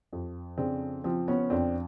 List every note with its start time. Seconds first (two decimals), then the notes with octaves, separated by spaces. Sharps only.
0.13 F2
0.58 C#3 C4 D4
1.04 F3 C4
1.28 B3 C#4
1.50 F2 C4 D4